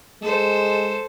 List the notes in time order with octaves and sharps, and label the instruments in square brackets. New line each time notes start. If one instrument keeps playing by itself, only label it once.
[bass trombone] G#3 [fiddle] A4 C5